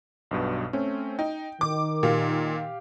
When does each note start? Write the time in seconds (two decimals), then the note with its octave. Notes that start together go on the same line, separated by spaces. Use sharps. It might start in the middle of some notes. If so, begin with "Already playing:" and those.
0.31 B1 G2 B2
0.73 A3 C4 C#4
1.19 D#4 G5
1.61 D#3 D6
2.03 A#2 G4 F5